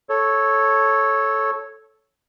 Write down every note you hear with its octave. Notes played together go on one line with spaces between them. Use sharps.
A4 C#5